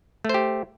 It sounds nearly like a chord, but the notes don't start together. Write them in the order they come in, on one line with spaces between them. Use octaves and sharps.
A3 C5 G4